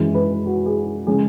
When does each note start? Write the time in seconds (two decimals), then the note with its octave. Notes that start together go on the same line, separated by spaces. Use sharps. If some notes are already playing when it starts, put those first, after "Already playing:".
Already playing: F#2 E3 G#3 G#4
0.14 B4
0.46 F#4
0.66 G#4
1.07 C#3 G#3 C#4 G#4